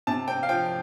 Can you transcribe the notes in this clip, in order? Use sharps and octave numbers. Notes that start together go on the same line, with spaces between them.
C3 A5
C4 G5
F5
F3 G5